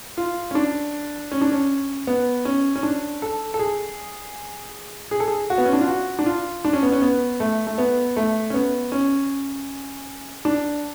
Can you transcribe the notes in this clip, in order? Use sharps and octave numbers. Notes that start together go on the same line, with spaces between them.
F4
C#4
D4
C#4
D4
C#4
B3
C#4
C#4
D4
A4
A4
G#4
G#4
A4
G#4
F#4
B3
C#4
D4
F4
F#4
D4
F4
D4
C#4
B3
C#4
B3
A3
A3
B3
A3
C#4
B3
C#4
D4